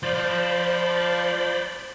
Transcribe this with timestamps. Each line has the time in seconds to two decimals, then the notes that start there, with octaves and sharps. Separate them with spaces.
0.03 F3 C5 D5 B5